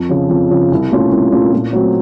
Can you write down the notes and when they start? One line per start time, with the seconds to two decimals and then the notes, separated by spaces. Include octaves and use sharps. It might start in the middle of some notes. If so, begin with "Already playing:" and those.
Already playing: F2
0.09 C#3 F3
0.29 F2
0.50 C#3 F3
0.72 C2
0.91 A#2 A3 C#4 F4
1.11 C2
1.32 A#2 A3 C#4 F4
1.53 A#2
1.73 F#3 A3 C4